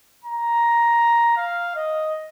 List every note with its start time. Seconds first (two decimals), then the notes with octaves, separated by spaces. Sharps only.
0.24 A#5
1.37 F5
1.75 D#5